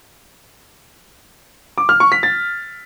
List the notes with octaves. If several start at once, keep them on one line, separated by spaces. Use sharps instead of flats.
D6
F6
C#6
B6
A6